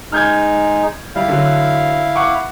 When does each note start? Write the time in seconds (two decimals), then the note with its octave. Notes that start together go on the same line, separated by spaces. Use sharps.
0.12 G#3 D#4 F6 G6 G#6
1.16 G3 E4 F5
1.28 D3 F#3
2.15 F#5 C#6 D6